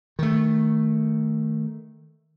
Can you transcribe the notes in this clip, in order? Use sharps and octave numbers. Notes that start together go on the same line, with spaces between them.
D#3 A3